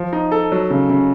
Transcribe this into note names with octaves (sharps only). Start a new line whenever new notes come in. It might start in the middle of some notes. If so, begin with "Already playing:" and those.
Already playing: F3
D#4
A4
F#3
C#3
C#3